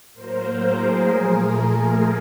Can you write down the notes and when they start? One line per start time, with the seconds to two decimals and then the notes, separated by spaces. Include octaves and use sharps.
0.14 A2 F#3 A#3 A#4 C5
0.61 G#4 A#4
1.08 A#2 F3 A3 G#4 A#4
1.55 G#4 A#4